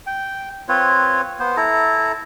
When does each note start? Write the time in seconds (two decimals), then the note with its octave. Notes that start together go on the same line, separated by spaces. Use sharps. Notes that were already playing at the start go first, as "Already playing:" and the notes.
0.07 G5
0.69 C4 F4 B4 C#5
1.40 B3 C5
1.57 E4 A4 A#5